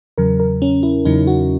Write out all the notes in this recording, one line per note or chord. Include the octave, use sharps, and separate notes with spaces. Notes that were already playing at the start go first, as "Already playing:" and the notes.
E2 C#3 F#3 A#4
A#4
C#4
E4
E2 C#3 F#3 D#4
F#4